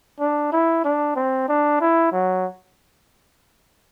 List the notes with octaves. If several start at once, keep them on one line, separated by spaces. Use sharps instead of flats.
D4
E4
D4
C4
D4
E4
F#3